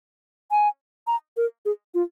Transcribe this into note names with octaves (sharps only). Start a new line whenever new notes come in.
G#5
A#5
A#4
G#4
F4